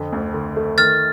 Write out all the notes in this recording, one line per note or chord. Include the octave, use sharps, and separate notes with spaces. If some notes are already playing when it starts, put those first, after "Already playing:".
Already playing: F2 D3
D2
D3
A3
D#3 F6 A6